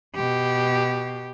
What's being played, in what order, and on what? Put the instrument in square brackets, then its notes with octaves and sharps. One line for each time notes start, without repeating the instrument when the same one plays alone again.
[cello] B2 G4